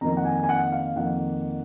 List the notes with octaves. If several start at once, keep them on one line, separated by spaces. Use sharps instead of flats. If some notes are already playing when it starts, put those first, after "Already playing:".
F2 D#3 A#3 A#5
F#5
G#5
G#5
F#5
F5
F2 D#3 A#3 F#5